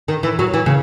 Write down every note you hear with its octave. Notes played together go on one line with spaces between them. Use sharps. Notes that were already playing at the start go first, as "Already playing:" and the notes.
D#3
E3
F#3
E3
C#3